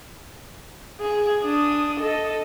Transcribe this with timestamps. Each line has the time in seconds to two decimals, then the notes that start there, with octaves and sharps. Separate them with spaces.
1.00 G#4
1.43 D4 D#6
2.00 A4 D#5